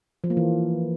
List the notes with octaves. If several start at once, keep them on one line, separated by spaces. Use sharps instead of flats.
F3
A#3
E3